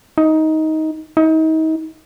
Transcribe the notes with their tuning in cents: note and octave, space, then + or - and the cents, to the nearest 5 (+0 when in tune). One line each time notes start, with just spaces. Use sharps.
D#4 +15
D#4 +35